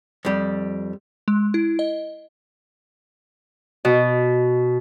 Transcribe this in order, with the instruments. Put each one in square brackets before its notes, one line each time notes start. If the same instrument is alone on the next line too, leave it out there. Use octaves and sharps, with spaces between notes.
[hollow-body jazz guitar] F2 G3
[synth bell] G#3
E4
D#5
[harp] B2